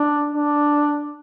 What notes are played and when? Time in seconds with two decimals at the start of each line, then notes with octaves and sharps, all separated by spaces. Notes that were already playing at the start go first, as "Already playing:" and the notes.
Already playing: D4
0.34 D4